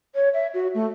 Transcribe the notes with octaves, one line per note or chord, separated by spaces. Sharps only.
C#5
E5
F#4
A3